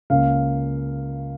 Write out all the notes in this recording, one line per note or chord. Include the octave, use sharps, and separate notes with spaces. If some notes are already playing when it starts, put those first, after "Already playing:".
C#2 C#3 A#3 C#4 F5